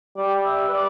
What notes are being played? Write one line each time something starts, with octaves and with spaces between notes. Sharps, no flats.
G3 D5
E5
B4
D5